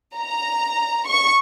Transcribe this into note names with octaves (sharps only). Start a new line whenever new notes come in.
A#5
C#6